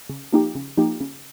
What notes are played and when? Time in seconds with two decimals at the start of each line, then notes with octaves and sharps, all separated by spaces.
0.09 C#3
0.32 F3 A#3 D#4 G4
0.55 C#3
0.77 F3 A#3 D#4 G4
1.00 C#3